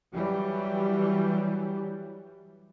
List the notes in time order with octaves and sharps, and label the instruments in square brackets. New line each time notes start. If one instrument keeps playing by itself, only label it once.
[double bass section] E3 F#3 G3